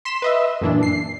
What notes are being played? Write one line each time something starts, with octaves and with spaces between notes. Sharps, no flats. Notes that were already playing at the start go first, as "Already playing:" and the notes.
C6 B6 E7
B4 D#5 E5
F#2 A#2 E3 D4
C7